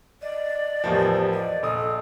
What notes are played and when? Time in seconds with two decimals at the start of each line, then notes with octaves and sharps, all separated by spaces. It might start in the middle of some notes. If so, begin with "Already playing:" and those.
0.22 D5 D#5
0.84 E2 A2 F3 G4 A#4
1.33 D5 D#5
1.63 A#1 A4 D#6